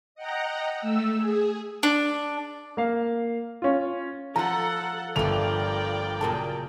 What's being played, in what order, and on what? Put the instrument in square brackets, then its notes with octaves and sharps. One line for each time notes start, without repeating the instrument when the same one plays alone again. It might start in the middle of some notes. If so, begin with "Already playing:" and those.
[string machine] D#5 F#5 G5 A#5
A3 E6
G#4
[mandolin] D4
[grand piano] A#3 F5
C#4 F4
[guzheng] F3 F4 [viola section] A4 F#5 [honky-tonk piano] A#5
[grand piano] G1 F7 [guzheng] F3 A3 [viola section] A#4 D5 G5
[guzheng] F#2 A#2 C#3 [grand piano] A5